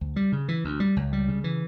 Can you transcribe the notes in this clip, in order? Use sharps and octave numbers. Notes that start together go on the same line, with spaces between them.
D2
G3
C#3
E3
D2
G3
C#2
G3
C#3
E3